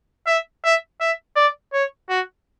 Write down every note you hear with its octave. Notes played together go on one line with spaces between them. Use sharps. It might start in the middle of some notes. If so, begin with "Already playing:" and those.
E5
E5
E5
D5
C#5
F#4